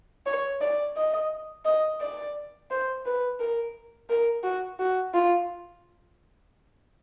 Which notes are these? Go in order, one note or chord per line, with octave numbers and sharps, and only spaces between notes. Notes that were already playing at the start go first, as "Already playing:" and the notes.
C#5
D5
D#5
D#5
D5
C5
B4
A#4
A#4
F#4
F#4
F4